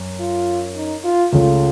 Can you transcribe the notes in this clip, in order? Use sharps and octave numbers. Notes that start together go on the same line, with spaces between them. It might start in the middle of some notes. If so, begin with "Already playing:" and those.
Already playing: F#2
F4
D#4
F4
C#2 C#3 A3 F4